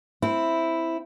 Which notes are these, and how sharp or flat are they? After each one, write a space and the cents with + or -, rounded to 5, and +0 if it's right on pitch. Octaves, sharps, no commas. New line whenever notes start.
C4 +0 E4 +0